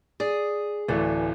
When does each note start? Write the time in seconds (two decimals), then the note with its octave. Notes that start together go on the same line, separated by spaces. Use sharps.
0.20 G#4 D5
0.88 D1 E3 A3 B4 D5 G#5